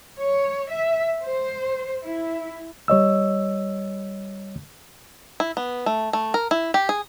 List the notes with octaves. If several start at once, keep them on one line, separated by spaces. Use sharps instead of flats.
C#5
E5
C5
E4
G3 C#5 D#5 E6
E4
B3
A3
A3
A#4
E4
G4
G#4